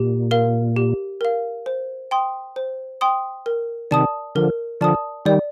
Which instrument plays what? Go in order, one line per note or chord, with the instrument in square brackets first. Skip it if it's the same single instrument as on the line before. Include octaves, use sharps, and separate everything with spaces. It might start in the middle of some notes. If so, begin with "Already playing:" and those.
Already playing: [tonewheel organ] A#2 [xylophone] G4
[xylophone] A#4 F5
G4
A#4 F5
C5
G5 C6 D#6
C5
G5 C6 D#6
A#4
[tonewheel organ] C3 D#3 [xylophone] D5 A5 D#6
[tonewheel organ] D3 F3 [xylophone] A#4
[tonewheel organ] D3 F3 [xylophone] D5 A5 D#6
[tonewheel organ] D#3 G3 [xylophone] D5